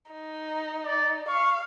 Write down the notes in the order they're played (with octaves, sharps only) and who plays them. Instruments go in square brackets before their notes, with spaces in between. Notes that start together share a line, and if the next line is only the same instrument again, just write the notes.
[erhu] D#4
[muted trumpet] D5
[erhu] F5 [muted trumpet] C#6